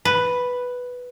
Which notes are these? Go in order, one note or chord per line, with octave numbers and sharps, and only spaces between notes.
B4